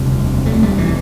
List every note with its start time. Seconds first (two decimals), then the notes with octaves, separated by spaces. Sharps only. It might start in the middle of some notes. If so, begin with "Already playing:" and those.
Already playing: E1 D2 C3 G3
0.46 A3
0.63 G3
0.78 E3